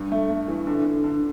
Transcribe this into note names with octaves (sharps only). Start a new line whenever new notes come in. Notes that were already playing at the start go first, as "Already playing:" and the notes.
Already playing: G2
A3
A3
E3
D3
D3
D3